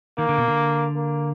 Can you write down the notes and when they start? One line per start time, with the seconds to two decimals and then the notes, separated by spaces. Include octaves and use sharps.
0.18 D#3 A#3
0.29 D3
0.38 B2
0.48 D3
0.96 A#3